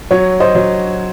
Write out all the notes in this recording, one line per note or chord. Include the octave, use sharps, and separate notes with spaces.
F#3 C#5
C5 D#5
F#3